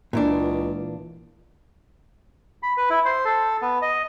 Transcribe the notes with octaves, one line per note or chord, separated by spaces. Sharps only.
C#2 A#2 E3 D4
B5
B4
E4
C5
A4
B3
D#5